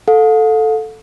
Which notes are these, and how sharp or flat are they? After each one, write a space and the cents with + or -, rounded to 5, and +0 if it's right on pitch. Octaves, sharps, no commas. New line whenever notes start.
A4 +0 F5 +45